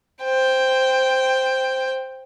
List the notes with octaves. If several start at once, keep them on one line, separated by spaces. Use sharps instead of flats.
C5 G5